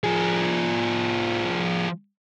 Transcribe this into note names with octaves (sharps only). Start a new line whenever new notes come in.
F3 G#4